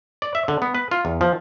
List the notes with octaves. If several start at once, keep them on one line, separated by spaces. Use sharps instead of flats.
D5
E5
D3
B3
B4
F4
E2
F3